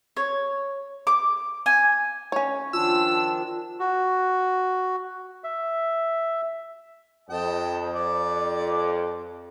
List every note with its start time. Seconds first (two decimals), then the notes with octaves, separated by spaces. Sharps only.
0.17 C#5
1.07 D6
1.66 G#5
2.32 C#4 C#5
2.73 D#3 F3 D4 F4 E6
3.80 F#4
5.44 E5
7.29 F2 D#5 G5 A5
7.94 D5